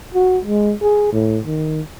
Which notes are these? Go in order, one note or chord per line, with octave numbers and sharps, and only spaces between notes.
F#4
G#3
G#4
A2
D#3